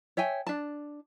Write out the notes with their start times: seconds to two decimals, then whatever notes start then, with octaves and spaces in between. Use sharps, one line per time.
0.17 C#5 E5 G5 G#5
0.47 D4 A5